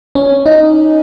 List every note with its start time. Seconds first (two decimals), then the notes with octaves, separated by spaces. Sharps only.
0.15 C#4
0.46 D#4